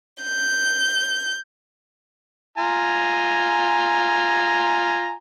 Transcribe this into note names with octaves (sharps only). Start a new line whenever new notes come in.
G6
F4 G#5 A#5